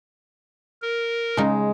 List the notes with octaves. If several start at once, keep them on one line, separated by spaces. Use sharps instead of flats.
A#4
C#3 G#3 D#4